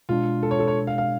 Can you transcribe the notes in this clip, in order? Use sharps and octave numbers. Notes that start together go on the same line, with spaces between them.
B2 G#3 D4 F4
A4
C#5
A4
C#5
F5
F5